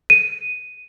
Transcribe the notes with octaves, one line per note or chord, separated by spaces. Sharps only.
D#7